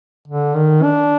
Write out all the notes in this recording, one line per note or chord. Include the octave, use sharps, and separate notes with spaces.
D3
D#3
D4